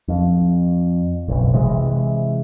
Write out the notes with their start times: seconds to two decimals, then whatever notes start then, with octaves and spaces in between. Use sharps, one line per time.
0.08 F2
1.28 F#1 B1
1.53 C3 E3 G#3